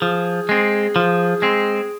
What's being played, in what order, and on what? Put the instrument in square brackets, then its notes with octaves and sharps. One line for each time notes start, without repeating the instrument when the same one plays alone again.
[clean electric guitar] F3 [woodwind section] G#4
[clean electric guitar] G#3 C4
F3
G#3 C4